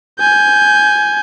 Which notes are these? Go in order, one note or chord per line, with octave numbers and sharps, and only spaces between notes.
G#5 G6